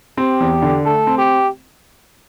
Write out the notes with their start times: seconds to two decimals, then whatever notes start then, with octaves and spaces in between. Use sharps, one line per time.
0.17 C4 G4
0.40 E2
0.62 D3
0.85 A3 A4
1.07 C4
1.18 G4